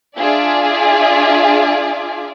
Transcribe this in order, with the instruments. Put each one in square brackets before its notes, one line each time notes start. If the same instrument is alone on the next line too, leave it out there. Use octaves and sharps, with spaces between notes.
[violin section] D4 F4 G#4 D5 E5